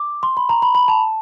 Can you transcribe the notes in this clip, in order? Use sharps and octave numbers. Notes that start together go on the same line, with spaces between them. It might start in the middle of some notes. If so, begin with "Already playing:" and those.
Already playing: D6
C6
B5
A#5
B5
B5
A5